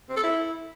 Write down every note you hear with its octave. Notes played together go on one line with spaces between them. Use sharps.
C4
A4
E4